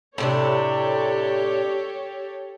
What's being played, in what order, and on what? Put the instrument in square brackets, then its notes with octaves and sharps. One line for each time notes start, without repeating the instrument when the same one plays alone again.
[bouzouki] A2 C3 D4 [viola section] G4 A4 C#5